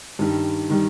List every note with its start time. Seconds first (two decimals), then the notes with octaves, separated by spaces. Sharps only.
0.19 G2 D#3 G3
0.70 D#3 G3